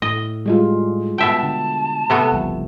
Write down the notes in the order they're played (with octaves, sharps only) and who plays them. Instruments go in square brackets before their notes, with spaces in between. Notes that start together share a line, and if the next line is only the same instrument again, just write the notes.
[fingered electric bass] A2 [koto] D#5
[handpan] G3 G#3 F4
[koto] B2 E5 G5 [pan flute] A5
[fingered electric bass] D3
[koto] C3 A3 B3
[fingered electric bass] F#1 C2 F3